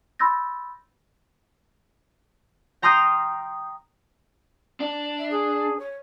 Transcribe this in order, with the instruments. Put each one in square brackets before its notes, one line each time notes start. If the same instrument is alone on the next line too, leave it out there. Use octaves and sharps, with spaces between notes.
[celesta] B5 C6 E6 G6 A6 A#6
[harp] G5 A#5 C6 D#6 F6 G6
[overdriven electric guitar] D4
[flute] E5
G#4
C#5